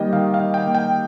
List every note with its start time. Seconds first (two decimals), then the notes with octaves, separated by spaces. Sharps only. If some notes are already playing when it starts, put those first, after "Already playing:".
Already playing: D#3 G3 A#3 D#5 G5
0.13 D#3 F5
0.34 F5
0.40 D#3
0.54 G5
0.67 A#3
0.75 G5